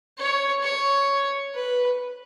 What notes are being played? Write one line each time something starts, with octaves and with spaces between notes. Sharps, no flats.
C#5
C#5
B4